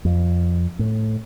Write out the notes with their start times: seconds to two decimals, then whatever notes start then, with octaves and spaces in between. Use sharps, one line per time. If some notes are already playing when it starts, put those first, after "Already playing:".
0.05 F2
0.79 A2